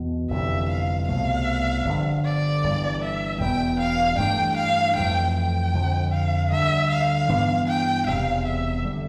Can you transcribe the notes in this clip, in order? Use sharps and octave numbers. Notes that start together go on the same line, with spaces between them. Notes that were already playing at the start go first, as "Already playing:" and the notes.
Already playing: E2 B2 B3
G1 F2 C3 E3 E5
F5
C2 B2 A3 F5
G1 G2 D3 F3
D5
G1 G2 E3
E5
E1 E2 B2 B3 G5
F5
G2 E3 A3 D4 G5
F5
F2 E3 A3 G5
G5
F2 D3 F3
F5
D2 D3 G3 E5
F5
G2 E3 B3 D4
G5
E1 E2 C3 F5
E5
D3 G3